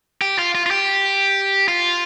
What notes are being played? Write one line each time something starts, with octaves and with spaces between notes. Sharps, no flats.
G4
F4
F4
F4
G4
F4